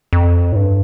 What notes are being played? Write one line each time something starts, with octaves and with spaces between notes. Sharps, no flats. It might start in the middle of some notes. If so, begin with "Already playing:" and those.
F2
A2
G2